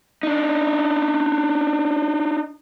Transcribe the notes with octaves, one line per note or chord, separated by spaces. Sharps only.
D4 D#4